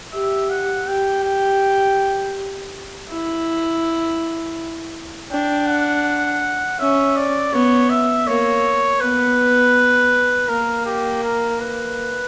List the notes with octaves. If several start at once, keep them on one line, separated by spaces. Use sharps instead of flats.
G4 E5
F#5
G4 G5
G5
E4
D4 G5
F#5
C#4 E5
D5
B3 C#5
E5
A#3 C#5
B3 B4
A#3 A#4
G4
A#4
B4